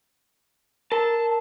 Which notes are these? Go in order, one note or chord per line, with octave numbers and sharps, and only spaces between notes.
A#4 A5